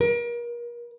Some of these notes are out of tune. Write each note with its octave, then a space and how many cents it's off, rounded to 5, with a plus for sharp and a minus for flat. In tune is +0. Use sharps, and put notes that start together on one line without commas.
A#4 +35